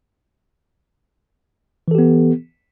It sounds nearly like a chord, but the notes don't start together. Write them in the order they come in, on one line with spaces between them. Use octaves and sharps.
E3 A4 G4 B3